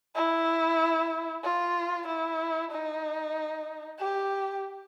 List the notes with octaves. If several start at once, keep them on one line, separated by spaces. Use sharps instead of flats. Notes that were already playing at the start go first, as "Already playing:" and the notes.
E4
F4
E4
D#4
G4